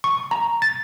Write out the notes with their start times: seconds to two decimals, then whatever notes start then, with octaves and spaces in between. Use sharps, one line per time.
0.04 C#6
0.31 A#5
0.62 A6